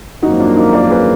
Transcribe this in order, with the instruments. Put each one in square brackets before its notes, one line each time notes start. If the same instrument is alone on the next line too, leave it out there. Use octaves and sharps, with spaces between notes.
[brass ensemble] G#1 F#2 F3 A#3 [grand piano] D#4 F#4
[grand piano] D4 F4
D#4
A#4 D5
G#4 B4